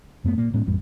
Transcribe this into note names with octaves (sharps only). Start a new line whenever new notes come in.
F#2 A3 B3
A#2 A#3
A2 G#3 B3 C#4
A1 F2 G3